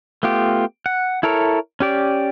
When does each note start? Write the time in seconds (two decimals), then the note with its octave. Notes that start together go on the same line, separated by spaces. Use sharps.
0.23 A3 B3 F4 G4
0.86 F#5
1.23 E4 A4 A#4 C#5
1.80 C#4 G4 D5